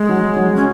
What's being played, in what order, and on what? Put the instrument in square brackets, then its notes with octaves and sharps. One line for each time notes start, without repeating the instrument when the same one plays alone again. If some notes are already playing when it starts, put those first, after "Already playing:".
Already playing: [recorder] G#3
[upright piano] F#3
F#3
[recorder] C#4